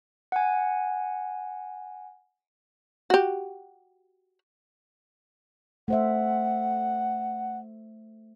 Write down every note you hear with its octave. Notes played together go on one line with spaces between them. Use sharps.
F#5 G#5
F#4 G4
A3 C5 E5 F#5